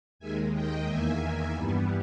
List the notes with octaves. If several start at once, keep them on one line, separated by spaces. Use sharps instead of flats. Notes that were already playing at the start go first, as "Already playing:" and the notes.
D#2 D#3 G#3 E5 G#5
D#5 G5
E2 D#3 A#3 E5 G#5
G2 E3 G3 B3